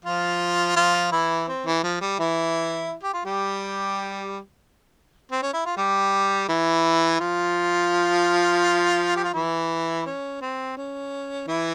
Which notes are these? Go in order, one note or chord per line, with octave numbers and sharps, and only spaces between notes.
F3 F4
F3 F4
E3 E4
C4
E3
F3
G3
E3 E4
G4
F4
G3 G4
C4
C#4
E4
F4
G3 G4
E3 E4
F3 F4
G4
F4
E3 E4
C#4
C4
C#4
E3 E4